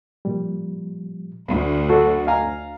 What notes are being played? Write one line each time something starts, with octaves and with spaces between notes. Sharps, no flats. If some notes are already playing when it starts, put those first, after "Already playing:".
A#2 F3 G3
D2 B5
F#2 A3 F#4 A4
F5 G#5 A#5